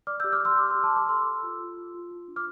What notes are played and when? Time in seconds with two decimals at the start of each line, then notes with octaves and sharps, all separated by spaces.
0.07 D5 D6 F6
0.20 E6 G6
0.24 G4
0.33 D6 F6
0.41 D5 C6 E6
0.58 G4 D6 F6
0.71 C6 E6
0.75 G4
0.84 A5 C6
0.92 G4 B5 D6
1.09 A4 C6 E6
1.27 A4
1.43 F4
1.60 F4
1.77 F4
1.94 F4
2.11 F4
2.28 D4
2.36 D6 F6